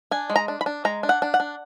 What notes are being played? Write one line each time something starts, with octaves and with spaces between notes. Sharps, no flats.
D4 G#5
G#3
A#5
D4
B5
D4
G#3 A#5
D4
F#5
D4
F#5
D4